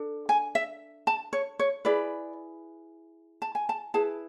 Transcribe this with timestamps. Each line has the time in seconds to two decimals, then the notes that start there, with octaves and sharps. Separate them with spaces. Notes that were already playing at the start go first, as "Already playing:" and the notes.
Already playing: D4 A4
0.29 G#5
0.55 E5
1.07 A5
1.33 C#5
1.59 C#5
1.85 E4 G#4 B4 D5
3.42 A5
3.55 G#5
3.69 A5
3.94 E4 G#4 B4 A5